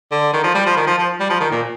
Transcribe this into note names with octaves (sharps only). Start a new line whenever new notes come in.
D3
D#3
F3
G3
F3
D#3
F3
F3
G3
F3
D#3
A#2